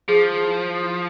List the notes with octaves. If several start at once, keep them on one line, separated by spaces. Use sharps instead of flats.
F3 G#4
E4
E4